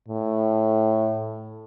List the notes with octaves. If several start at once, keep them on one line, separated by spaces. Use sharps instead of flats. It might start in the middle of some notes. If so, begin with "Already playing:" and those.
A2